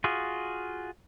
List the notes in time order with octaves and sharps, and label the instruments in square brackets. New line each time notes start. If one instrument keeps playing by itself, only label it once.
[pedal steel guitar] F4 F#4 G#4